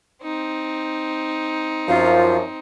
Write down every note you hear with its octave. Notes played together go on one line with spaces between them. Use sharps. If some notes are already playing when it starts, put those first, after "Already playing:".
C4 D#4
F#2 F3 F4